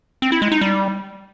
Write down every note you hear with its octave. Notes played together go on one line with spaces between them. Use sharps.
C4
E4
G#3
D#4
G3